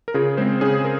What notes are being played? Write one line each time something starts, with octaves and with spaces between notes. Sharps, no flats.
A#4
C#3 F4 G#4
G#3 C4 G#4 C5
C#3 G#4 C5
A#4